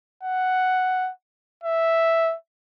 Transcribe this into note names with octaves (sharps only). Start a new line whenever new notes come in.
F#5
E5